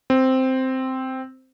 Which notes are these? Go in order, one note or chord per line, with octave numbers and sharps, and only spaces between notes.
C4